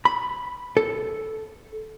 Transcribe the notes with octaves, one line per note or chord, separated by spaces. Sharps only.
B5
A4